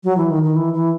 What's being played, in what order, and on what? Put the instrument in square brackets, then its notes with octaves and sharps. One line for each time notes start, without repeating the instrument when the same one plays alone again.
[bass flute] F#3
E3
D#3
D#3
E3
E3